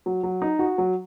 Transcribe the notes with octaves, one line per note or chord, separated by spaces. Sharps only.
F#3
F#3
D#4
F#4
F#3